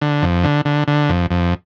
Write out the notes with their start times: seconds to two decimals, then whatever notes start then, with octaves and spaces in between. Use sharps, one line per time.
0.01 D3
0.22 F2
0.44 D3
0.65 D3
0.88 D3
1.09 F2
1.31 F2